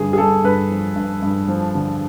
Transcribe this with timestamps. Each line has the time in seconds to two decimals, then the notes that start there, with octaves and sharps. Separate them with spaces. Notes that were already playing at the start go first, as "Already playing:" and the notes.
Already playing: G2 D3 G#4
0.13 G#4
0.18 G2 A4
0.44 G2 B4
0.71 F3
0.96 G2
1.22 G2
1.48 F3
1.75 D3